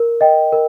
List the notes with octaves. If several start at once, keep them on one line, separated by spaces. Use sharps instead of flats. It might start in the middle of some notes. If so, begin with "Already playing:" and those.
Already playing: A#4
D#5 G5
A#4